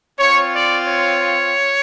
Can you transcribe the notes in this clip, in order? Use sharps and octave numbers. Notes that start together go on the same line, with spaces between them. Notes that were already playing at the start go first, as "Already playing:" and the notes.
C4 F4 C#5
D5
C#5